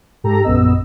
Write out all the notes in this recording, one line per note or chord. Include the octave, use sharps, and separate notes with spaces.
G#2 G4 A4 A#5
A#1 F#2 B3 D#5 E6